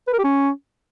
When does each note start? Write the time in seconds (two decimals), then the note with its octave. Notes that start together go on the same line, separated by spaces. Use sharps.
0.08 B4
0.13 A#4
0.19 G4
0.24 C#4